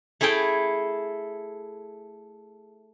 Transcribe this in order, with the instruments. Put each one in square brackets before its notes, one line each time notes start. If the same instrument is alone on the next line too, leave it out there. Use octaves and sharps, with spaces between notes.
[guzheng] A3 E4 G#4 A4 G5